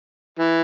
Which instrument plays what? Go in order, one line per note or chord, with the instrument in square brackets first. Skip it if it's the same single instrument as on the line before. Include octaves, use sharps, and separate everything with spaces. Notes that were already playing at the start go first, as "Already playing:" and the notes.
[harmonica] E3